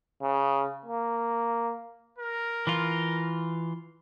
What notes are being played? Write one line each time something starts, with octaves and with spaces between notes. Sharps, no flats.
C#3
A#3
A#4
E3 F4